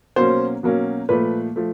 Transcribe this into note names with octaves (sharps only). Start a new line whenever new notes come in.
B2 F#3 A#3 C#4 C5
B2 F#3 A#3 C#4
A#2 F3 A3 B4
F3 A3